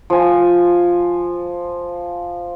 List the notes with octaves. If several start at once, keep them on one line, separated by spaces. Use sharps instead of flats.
F3 G#5